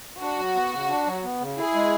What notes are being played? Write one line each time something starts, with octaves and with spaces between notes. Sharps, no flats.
D4 F#4
F#3
B3
C#3
D4
F#3
B3
C#3
E4 G#4
G#3